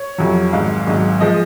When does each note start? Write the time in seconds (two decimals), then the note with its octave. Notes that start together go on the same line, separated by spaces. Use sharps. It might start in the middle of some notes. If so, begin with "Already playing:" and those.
Already playing: C#5
0.18 F2 C3 F#3
0.52 G#1 G#2 F#3 F5
0.87 G#1 G#2 F#3
1.20 F3 G#3 D#5